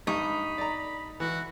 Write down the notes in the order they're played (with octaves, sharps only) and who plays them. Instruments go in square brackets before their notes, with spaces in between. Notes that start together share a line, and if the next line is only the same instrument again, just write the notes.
[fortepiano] G2 C#6 [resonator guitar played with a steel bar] D#4 [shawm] B5
[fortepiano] D5 A#5
[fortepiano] E3 [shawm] F#4